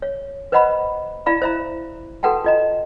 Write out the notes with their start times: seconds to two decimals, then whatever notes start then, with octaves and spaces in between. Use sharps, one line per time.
0.02 C#5
0.52 B4 C5 D#5 F#5 A#5 B5
1.26 E4 D5 F5 A#5 B5
1.42 C5 E5 A#5
2.23 F#4 A4 B4 F#5 G5 A5
2.44 F4 D#5 A#5